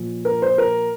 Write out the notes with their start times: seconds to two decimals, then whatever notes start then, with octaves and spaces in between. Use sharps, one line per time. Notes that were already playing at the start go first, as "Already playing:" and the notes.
Already playing: A#2 F3
0.25 A#4
0.42 C5
0.58 A#4